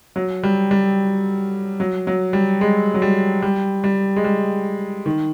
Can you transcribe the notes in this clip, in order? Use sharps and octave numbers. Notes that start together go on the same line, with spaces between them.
F#3
G3
G3
F#3
F#3
G3
G#3
F#3
G3
G3
G3
G#3
G3
D#3